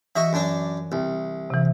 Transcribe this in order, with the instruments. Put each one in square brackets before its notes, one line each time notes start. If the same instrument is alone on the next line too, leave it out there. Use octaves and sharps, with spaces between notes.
[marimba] E3 [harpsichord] F#4 D#5 E5
[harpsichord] F#2 D4
C2
[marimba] C3 E3